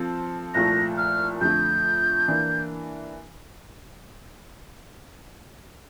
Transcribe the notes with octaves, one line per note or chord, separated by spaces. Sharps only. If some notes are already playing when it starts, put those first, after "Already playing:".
Already playing: F3 C4 A4
C2 A#2 F3 A3 A#6
F6
F2 D3 A3 G6
E3 A#3 D4